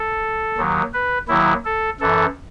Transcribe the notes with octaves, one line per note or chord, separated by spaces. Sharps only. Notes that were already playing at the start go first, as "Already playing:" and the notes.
Already playing: A4
D#2 D#3 F#3
B4
D#2 D#3 F#3 E4
A4
F#2 E3 A4